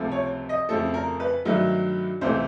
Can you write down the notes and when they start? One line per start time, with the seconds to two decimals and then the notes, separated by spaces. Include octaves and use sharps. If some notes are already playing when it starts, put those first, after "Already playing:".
Already playing: C#2 C3 F3 A3
0.11 C#5
0.49 D#5
0.69 F2 C#3 F3 A3 A4
0.94 A#4
1.20 B4
1.45 G2 D#3 F#3 A3
2.21 C#2 C3 E3 A3 C5